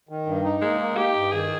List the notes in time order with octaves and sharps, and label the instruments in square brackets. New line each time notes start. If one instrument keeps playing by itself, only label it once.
[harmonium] D#3
G2
D#4
[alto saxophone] G#3 [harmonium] A#3
[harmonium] A#3
[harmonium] D#4 [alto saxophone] G4
[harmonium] G2
[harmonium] D#3 [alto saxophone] G#4